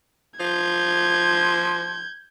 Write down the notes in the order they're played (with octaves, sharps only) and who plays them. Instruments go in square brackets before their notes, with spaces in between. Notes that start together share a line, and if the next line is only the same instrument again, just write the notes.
[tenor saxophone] F3 [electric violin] G6 G#6